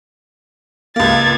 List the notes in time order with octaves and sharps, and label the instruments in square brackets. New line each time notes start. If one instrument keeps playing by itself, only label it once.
[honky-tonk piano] C#2 A#3 [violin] G#6 A6